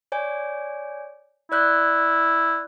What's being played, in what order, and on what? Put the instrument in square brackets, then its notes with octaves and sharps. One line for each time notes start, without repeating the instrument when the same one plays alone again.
[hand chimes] C#5 D5 G#5
[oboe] E4 [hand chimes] D5 F#6 G6